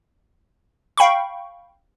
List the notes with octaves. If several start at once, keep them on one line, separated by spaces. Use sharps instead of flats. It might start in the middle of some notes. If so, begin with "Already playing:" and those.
F5 G5 B5 C#6